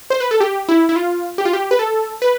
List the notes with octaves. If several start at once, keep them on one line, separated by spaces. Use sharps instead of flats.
C5
B4
A4
G4
E4
E4
F4
G4
F4
G4
B4
A4
B4